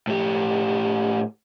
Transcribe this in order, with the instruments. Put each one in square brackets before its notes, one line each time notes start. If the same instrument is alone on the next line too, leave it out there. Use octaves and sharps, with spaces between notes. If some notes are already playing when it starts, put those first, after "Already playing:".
[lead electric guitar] A2 G4